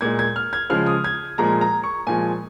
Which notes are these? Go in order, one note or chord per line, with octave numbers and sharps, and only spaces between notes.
A#2 G#3 G#6
G#6
F6
G#6
C#3 F3 G#3 F6
D#6
G#6
A#2 F3 G#3 A#5
A#5
C#6
A#2 F3 G#3 G#5